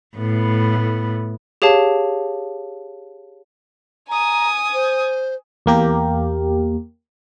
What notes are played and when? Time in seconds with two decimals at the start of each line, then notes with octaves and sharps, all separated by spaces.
0.17 A2 B3
1.62 G4 G#4 C#5 F5 A5
4.09 G#5 A#5 D#6
4.74 C5
5.66 E2 A#3 G4 A#4